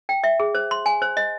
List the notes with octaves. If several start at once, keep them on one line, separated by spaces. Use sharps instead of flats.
G5
E5
G#4
C5
C6
G#5
C5
D#5